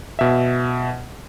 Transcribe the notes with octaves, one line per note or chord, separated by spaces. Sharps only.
B2 E5